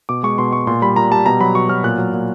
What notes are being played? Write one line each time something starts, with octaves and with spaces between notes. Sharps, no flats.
B2 D6
G#3 C#6
B2 C6
G#3 C#6
A#2 C6
G3 B5
A#2 A#5
G3 A5
B2 A#5
F#3 B5
B2 C#6
F#3 F6
A#2 F#6
F#3
A#2